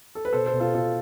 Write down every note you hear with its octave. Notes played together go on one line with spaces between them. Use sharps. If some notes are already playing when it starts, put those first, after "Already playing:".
A4
B4
B2 A4 C5
A4 C5
B2
F4 A4
B2 F4 A4